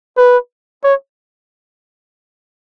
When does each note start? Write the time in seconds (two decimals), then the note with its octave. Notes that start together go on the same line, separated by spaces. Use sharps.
0.17 B4
0.84 C#5